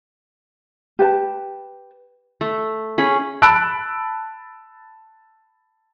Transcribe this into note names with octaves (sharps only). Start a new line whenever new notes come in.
G4 B4 A5
A3
C#4 G#4 B5
A5 B5 E6 F#6 D7